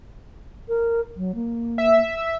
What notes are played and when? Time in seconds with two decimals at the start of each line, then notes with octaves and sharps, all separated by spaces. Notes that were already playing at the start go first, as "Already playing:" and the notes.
0.68 A#4
1.17 F#3
1.35 A#3
1.78 E5